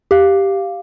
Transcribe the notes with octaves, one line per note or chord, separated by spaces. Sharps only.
G4 F5